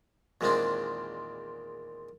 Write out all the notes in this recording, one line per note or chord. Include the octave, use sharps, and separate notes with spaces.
E2 A#2 D#3 G#3 C4 D4